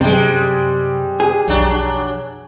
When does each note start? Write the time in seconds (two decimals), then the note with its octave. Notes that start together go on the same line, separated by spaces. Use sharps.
0.01 F#2 C3 G3 G#3
1.20 G#4
1.48 B1 F2 F#3 D4